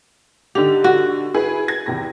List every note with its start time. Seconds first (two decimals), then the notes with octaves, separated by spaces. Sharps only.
0.55 D3 D#4 G4 F7
0.84 F#4
1.34 E4 G#4 B4
1.68 G#6
1.86 E2 C3 A#6